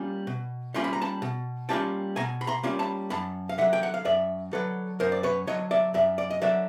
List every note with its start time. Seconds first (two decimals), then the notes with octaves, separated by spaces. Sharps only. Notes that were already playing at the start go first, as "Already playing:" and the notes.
Already playing: G3 A#3 C#4 F4
0.27 B2
0.74 G3 A#3 C#4 F4 C6
0.84 B5
0.93 A#5
1.02 A5 B5
1.22 B2
1.69 G3 A#3 C#4 F4 G5 A5
2.16 B2 G#5 A#5
2.41 B5
2.47 A#5 C6
2.63 G3 A#3 C#4 F4
2.79 A5 B5
3.10 F#2 A5 B5
3.49 F5
3.58 D3 F#3 E5 F#5
3.73 G5
3.83 F#5
3.94 F5
4.05 F#2 D5 E5
4.53 D3 F#3 A4 B4
5.00 F#2 A#4 C5
5.12 D5
5.23 B4 C#5
5.47 D3 F#3 C#5 D#5
5.71 D5 E5
5.94 F#2 D5 E5
6.18 D5
6.30 D#5
6.42 D3 F#3 D5 E5